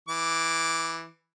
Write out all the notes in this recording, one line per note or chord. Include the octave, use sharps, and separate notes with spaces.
E3 D6